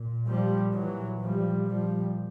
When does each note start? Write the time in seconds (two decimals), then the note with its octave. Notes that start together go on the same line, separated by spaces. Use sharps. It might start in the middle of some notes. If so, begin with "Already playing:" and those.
Already playing: A#2
0.26 F3 G3
0.73 E3 F#3
1.20 A#2 F3 G3
1.68 F3 G3